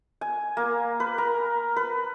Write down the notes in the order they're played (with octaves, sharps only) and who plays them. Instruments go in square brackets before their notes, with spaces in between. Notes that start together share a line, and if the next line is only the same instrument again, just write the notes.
[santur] G#5
A#3
B4
A#4
B4